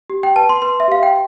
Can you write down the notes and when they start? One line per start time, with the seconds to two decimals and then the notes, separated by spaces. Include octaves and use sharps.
0.10 G4
0.23 G5
0.36 B4 A5
0.49 C6
0.62 B4 C6
0.80 E5
0.88 G4 F5
1.03 G5